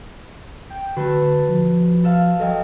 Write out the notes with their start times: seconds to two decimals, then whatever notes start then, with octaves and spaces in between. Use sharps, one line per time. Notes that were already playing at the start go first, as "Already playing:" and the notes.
0.70 G5
0.97 D3 A3 F#4 A4 B4
1.49 F3
2.04 A4 E5 F5
2.40 F#3 A4 D#5 G5